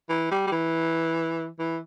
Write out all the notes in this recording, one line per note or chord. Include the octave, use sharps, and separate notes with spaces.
E3
G3
G3
E3
E3